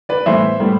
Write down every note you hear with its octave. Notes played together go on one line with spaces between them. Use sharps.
B4 D5
A2 E3 G3 B3 C5 E5
A2 G3 B3